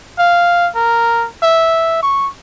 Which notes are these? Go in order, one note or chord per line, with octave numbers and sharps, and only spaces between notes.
F5
A#4
E5
C#6